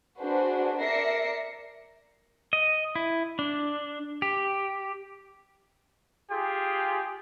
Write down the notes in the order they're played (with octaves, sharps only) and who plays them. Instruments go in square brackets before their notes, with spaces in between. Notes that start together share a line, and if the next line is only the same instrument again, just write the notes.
[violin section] D4 F#4 G#4 B4 C5
A#4 D5 E5 A#6 C7 C#7
[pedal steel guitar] D#5
E4
D4
G4
[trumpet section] F4 G4 G#4